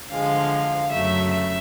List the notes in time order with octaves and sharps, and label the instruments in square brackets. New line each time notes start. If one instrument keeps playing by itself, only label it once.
[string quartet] D3 F3 G#3 F5
F#2 C#3 F#3 A3 E5
E5